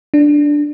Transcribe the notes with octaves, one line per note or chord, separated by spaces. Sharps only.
D4